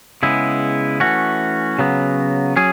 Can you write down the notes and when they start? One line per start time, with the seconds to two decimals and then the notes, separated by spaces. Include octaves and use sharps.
0.23 C#3 G#3 B3 E4
1.00 E3 A3 C#4 F#4
1.79 C#3 F#3 B3
2.57 F#3 C#4 G#4